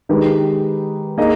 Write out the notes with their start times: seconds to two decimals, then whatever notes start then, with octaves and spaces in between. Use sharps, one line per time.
0.09 D#3 G#3 D#4 G4 B4
1.18 A#3 D#4 G#4 D#5